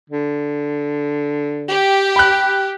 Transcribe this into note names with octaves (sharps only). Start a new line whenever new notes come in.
D3
G4
B5 F#6